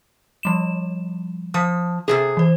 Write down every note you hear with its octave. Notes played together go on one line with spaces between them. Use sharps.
F3 G3 E7
F3 D#6
C3 F3 G#4
E3 C5